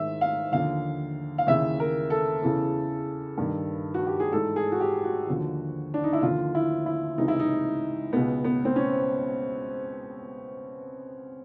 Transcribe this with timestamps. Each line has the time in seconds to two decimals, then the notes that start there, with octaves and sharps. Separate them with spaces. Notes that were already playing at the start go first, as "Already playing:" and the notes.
Already playing: G#2 D#3 E5
0.21 F5
0.52 D#2 D3 F3 F5
1.38 F5
1.47 D#2 C#3 E3 E5
1.80 A#4
2.10 A4
2.42 E2 C#3 E3
3.38 G2 D#3
3.94 F#4
4.07 G4
4.20 G#4
4.32 G#2 E3 A4
4.56 G#4
4.72 F#4
4.80 G4
5.04 F#4
5.27 D#2 D3 F3
5.94 D4
6.04 D#4
6.13 E4
6.22 D#2 D3 F3 F4
6.55 E4
6.86 E4
7.17 C#2 C3 E3 D#4
7.28 E4
7.40 D#4
8.12 C#2 B2 B3
8.45 B3
8.65 C4
8.76 C#4